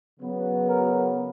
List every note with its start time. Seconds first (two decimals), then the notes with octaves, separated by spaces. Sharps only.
0.19 C#3 F#3 B3
0.66 F#4 A#4